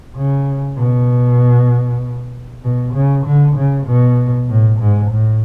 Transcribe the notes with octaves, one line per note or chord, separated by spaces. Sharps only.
C#3
B2
B2
C#3
D3
C#3
B2
A2
G#2
A2